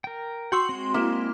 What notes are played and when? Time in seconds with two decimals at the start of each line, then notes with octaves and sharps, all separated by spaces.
0.04 A#4 G5
0.52 F#4 G5 C6 C#6 E6
0.69 G#3 C4
0.94 A#3 E4